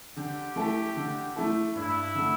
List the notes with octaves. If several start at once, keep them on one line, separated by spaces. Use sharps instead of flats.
D3 G4
A3 E4 A4
D3
A3 E4 A4
G2 E4
D3 A3